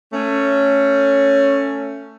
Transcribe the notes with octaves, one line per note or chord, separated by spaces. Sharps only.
A3 C#4